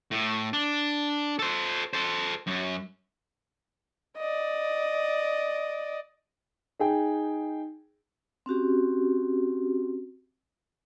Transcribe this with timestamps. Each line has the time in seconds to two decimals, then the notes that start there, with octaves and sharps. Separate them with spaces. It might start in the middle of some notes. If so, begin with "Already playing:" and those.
0.11 A2
0.53 D4
1.39 A4 C5
1.93 A4 C5
2.47 F#2
4.17 D5 D#5
6.79 D#4 G#4 G5
8.46 C4 C#4 F#4 G4